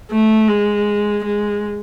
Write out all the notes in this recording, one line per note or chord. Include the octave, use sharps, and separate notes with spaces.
A3
G#3
G#3